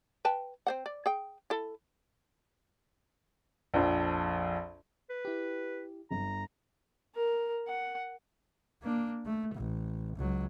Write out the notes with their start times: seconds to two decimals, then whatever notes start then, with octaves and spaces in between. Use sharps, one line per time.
0.25 B4 G5 A5
0.67 C4 C5 F#5
0.86 D5
1.06 G#4 G5
1.50 E4 A4
3.74 A#1 F2
5.10 B4
5.25 E4 G4
6.11 G1 A#5
7.16 A#4
7.68 F#5
8.83 A#3 D4
9.26 A3
9.55 A1
10.16 C#2 F#3